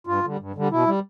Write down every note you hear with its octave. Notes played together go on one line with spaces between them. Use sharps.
G2 F4
D3 G3
G2
D3 G3
B2 E4
G3